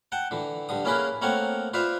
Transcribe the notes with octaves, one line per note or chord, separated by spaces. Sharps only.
F#5 G5 A5
D3 E3
G2 D3 D#6
A#3 C#4 E4 G#4 A#4 B4
A3 A#3 C4 A#4 C#5 F#5
F4 B4 C5 D5 E5 F5